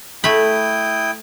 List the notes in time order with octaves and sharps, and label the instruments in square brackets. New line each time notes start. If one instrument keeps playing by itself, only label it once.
[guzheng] A3 B5 [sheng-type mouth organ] E4 G5 D#6